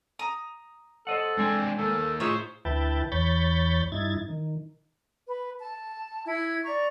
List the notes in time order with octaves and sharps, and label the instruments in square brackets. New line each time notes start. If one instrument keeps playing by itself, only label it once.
[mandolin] A#5 D#6
[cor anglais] A4 [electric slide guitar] C5 D#5 F#5
[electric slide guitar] G#3 G#5 [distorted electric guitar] C4 D4
[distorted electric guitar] D#3 A#3 [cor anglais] A4
[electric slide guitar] A2 F4 G#4 [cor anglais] D#4 [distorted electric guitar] C5 [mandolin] C#5 E5
[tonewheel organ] D2 E4 B4 G5 A5
E2 C#5 B5 G6 A6
G2 D#4 E4 G#6 A6
D#3
[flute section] B4
A5
E4 G#6
D5 A#5 C#6